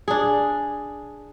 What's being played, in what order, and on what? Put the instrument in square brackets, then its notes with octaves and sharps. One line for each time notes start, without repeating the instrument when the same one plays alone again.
[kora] D4 G#4